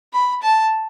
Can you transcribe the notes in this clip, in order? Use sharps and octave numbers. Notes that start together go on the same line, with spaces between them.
B5
A5